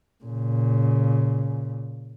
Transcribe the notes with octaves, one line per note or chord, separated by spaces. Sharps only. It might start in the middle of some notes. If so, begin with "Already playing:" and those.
A#2 C#3